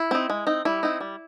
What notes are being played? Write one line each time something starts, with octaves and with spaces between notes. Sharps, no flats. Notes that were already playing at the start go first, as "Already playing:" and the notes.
Already playing: E4
C4 D#4
G#3
C4 D#4
G3 E4
C4 D#4
G3